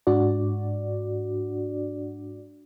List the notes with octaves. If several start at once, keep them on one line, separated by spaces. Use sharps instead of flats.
G#2 D4 F#4 D5